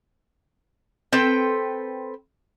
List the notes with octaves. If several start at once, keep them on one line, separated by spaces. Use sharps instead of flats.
C4 A4 B4 G5